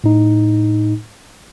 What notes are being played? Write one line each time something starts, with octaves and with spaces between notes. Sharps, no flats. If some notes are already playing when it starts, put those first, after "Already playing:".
A2 D#4